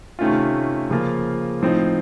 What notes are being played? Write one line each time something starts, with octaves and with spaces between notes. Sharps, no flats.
C3 D#3 A3 C#4 F4
C#3 F3 A#3 F4
A2 F3 C4 D#4